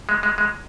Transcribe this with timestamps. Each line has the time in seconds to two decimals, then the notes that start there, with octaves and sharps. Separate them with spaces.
0.09 G#3
0.23 G#3
0.38 G#3